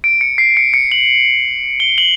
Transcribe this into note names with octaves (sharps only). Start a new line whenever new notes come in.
D7
C#7
C7
C#7
C#7
F#7
G7
F#7